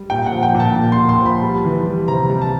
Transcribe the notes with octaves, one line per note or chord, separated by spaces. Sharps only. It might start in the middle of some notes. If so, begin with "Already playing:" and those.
Already playing: G3
A#2 G5
F#5
F3
G5
A#2
A5
A#2
C6
A#2
C6
F3 B5
G3
E3
G3
C3 A#5
G3
A5